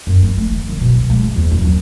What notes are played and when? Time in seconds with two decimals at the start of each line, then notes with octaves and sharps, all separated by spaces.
0.07 F#2
0.22 C4
0.38 A3
0.51 D#3
0.69 C2
0.81 B2
0.95 C2
1.10 G#3
1.23 C#3
1.36 E2
1.51 F#2
1.65 D#2